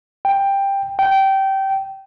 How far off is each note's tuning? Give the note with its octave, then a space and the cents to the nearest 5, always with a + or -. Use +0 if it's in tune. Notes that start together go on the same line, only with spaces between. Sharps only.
G5 +10
G5 -20